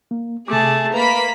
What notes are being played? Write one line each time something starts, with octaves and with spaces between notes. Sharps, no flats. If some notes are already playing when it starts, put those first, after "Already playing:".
A#3
C3 A3 G#4 A5 D6
A#3 B4 A#5 B5 B6